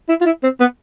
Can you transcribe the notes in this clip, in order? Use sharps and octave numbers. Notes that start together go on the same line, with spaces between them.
E4
F4
E4
C4
B3